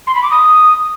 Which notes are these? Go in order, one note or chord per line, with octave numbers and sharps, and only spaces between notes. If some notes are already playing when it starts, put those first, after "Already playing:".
C6
B5
D6
D#6